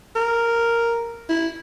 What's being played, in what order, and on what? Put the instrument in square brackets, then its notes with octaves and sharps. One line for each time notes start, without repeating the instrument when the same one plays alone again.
[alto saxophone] A#4
E4